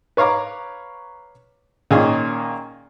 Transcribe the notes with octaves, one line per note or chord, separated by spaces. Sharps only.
B4 C#5 F5 A#5 D6
A#2 D#3 A#3 C#4 G#4